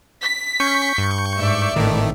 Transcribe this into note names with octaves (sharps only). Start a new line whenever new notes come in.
B6
C#4 C#6 G6 C#7
G2
G#2 D5 E5
G#1 A2 D#3 A3